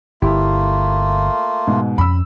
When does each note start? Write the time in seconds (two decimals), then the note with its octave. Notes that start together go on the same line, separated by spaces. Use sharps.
0.22 G1 A3 A#3 E4 F4 G4
1.67 G#2 B2
1.98 F2 C#4 B5 E6